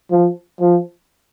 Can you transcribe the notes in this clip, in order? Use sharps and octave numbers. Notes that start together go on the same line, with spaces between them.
F3
F3